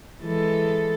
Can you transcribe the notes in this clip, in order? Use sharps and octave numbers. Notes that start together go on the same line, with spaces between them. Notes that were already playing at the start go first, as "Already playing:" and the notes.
E3 G#3 A4